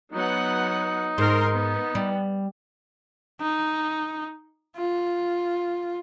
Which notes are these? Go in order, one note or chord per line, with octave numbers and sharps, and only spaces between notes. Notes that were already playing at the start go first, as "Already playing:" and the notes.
F#3 B3 D#4 F#5
G#2 D#3 A#4 C6
B3
G3
D#4
F4